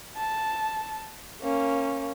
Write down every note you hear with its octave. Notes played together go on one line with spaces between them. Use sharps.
A5
A#3 C#4